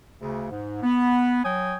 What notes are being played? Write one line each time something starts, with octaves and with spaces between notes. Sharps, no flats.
D2 C#3
G#2
B3
F#3 C#5 G5 G#5 D#6